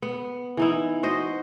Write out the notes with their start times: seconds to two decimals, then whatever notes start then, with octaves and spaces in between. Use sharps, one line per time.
0.02 B3
0.57 E3 D#4 E4
1.03 F#4 C5 D#5